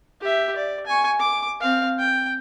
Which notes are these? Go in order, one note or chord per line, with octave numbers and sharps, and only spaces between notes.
G4 E5
D5
G#5 C#6
D6
C4 F5
G5